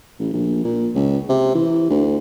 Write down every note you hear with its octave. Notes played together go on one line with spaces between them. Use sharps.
A1
A#1
A#2
C#2
C3
E3
D2